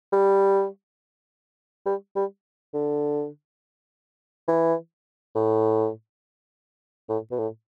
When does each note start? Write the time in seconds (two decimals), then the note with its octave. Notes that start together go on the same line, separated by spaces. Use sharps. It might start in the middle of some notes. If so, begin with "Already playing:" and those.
0.12 G3
1.86 G3
2.16 G3
2.74 D3
4.48 E3
5.35 A2
7.09 A2
7.31 B2
7.38 A2